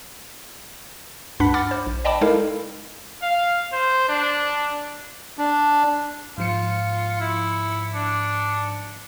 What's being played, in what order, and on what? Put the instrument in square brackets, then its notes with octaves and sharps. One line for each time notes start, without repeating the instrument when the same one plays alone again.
[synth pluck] C#2 G2 D4 F#5 B5 B6
F#5 B5 D6 F6 A6
C5
A#1
D5 D#5 G5 A5 B5 D6
G#3 D#4 E4 A4 A#4 F5
[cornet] F5
C5
D4
[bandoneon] D4
[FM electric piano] G#2 F3 C#7 [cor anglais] F4
[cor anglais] E4
D4